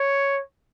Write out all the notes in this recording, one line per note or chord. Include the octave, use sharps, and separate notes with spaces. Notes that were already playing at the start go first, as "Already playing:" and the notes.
Already playing: C#5